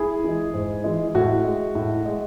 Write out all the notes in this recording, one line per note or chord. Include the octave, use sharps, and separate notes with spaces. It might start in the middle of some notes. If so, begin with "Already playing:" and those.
Already playing: E4 G#4
E3 G#3
G#2
E3 G#3
A2 F#4
G#3
A2
G#3